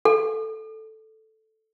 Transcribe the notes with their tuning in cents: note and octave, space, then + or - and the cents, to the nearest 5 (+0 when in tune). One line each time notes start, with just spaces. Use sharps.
A4 +0